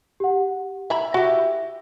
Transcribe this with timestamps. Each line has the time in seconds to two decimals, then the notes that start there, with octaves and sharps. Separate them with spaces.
0.20 G4 F#5
0.90 E4 E5 A#5 B5
1.14 E4 F#4 G4 A#6